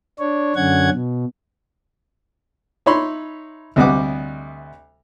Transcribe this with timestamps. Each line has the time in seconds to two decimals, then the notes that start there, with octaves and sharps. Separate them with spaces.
0.19 D4 C#5
0.56 F#2 D3 C#4 F#5 G#6
0.92 B2
2.86 D#4 C#5 E5 B5 C6
3.76 D2 C3 G3 D#5 F#5 D6